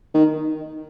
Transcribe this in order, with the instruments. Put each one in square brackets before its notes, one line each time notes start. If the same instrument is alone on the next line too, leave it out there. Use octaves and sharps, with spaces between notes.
[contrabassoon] D#3